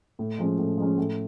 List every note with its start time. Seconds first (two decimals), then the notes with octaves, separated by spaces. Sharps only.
0.19 A2
0.39 F3 G#3 C#4
0.58 A2
0.78 F3 G#3 C#4
0.98 A2